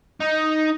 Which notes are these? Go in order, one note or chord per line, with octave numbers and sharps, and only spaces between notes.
D#4